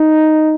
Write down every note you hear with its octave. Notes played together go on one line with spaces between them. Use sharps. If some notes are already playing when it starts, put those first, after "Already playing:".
Already playing: D#4